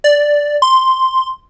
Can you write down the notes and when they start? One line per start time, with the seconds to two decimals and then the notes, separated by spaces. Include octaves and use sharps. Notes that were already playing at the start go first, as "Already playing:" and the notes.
0.04 D5
0.62 C6